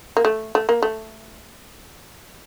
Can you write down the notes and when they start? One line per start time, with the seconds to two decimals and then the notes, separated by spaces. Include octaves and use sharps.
0.17 A#3
0.25 A3
0.55 A3
0.69 A#3
0.82 A3